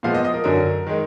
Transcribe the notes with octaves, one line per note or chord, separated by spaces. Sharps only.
A#2 F3 G#3 B3 F5
D#5
D#5
A#4
F#2 D3 F#3 A#4
D#3 G#3